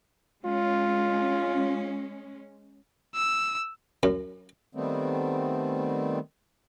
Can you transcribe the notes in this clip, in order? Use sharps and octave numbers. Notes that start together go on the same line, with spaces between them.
G#3 C#4 F4
E6
F#2
D#3 G3 A3 B3 C4